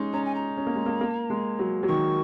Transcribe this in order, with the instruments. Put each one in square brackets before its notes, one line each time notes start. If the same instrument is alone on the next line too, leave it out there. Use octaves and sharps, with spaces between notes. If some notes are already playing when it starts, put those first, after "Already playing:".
Already playing: [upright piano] G#3 C#4 D#4
[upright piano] C#4 [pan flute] A#5
[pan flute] G#5
A#5
[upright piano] C#4
A#3
G#3
A#3
A#3
G#3
F#3
F#3
[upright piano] D#3 [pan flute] C#6